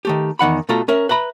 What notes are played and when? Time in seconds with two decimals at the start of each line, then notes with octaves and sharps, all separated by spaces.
0.05 D#3 A3 G4
0.39 E2 D#3 F#5 B5
0.69 B2 A3 F4 A4 A#5
0.88 C#4 A#4 E5
1.09 B4 E5 A#5 B5